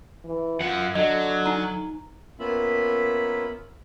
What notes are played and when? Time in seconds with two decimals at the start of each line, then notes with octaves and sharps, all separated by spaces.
0.25 E3
0.60 F#2 F4 F#5
0.95 D3 F#3 D#5
1.46 D#4 A#5
2.40 A#3 B3 C#4 F4 E5 B5